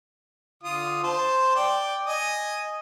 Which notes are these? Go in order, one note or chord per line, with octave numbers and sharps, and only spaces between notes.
D3 F4 D#6
C5 A5 C6
D5 G5
D#5 G#5 D#6